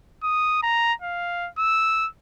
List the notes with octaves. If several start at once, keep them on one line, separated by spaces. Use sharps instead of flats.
D#6
A#5
F5
E6